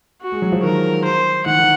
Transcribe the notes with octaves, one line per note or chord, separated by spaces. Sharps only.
F#4
G#3
F#3
F3
D#3 A#4
C5
D#3 F#5
D#3